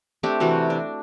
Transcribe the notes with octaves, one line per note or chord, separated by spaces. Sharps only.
A3 C4 D4 G4
C3 E3 F#4
D4